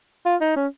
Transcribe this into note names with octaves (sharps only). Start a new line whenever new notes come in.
F4
D#4
C#4